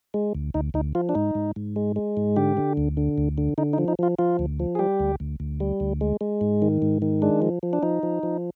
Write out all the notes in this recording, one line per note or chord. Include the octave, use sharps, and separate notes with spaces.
G#3
D2
D2 D#4
D2 D#4
F3 F4
D4
G#2 D#4
G#2
G#2
G#3
G#3
G#2
D3 G4
D3
D2
D3
D2
D3
D3 D#4
D#4
F3
D#4
F3 F4
F3 F4
D2
F3
G#4
G3 G4
D2
D2
D2
G3
D2
G#3
G#3
G#2
D#3
G#2
D#3
G#3 D4
F3
F3
D4
F3 D#4
F3
F3